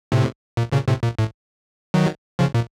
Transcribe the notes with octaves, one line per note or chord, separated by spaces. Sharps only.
A2 C3
A#2
A#2 C#3
A2 C3
A#2
A2
D#3 F#3
C#3 F3
A#2